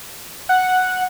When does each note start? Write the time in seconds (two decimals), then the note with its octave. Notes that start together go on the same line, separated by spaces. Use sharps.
0.49 F#5